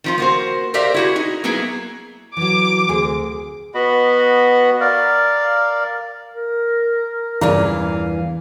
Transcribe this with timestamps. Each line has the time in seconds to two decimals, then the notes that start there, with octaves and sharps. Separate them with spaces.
0.04 D#3 F3 F4
0.18 A#3 F#4 C5
0.74 G4 A#4 C5 D5 E5 F5
0.94 E4 F#4 G#4
1.16 D#4
1.44 F#3 A#3 B3 E4 G#4
2.37 E3 F#3 D6
2.89 D2 C3 G#4
3.74 B3 F#4 D#5 B5
4.80 A#4 D5 F5
6.33 A#4
7.41 E2 G2 A#2 C#3 E3 F5 A#5